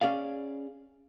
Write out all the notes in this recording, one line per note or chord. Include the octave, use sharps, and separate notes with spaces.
C#4 G#4 D5 F5